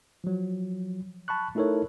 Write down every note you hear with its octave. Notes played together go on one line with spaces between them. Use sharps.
F3 F#3
A5 B5 C#6 F#6
A3 D#4 E4 A4 A#4 C#5